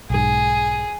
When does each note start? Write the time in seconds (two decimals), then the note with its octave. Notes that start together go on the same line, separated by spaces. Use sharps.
0.10 B1 G#2 G#4